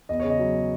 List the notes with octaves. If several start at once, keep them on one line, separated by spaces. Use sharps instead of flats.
E2 D#5
C#3 C#5
D#5
F#3